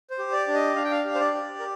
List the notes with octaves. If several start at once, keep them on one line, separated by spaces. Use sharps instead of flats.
C5
G4
D5
D4
D#5
D4 F5
G5
F5
G4
C5
D5
G4
A#4